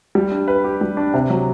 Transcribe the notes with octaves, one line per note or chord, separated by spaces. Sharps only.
G3
D4
B4
G4
G3
D4
C3
F#3